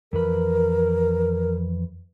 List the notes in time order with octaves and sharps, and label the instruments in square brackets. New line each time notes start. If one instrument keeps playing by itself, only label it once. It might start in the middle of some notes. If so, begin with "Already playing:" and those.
[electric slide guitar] F2 E3 B4 [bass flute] A#4